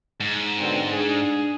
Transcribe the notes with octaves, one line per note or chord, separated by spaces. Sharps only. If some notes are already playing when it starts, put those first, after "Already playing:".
G#2
B2 D3 C4
D4 G#4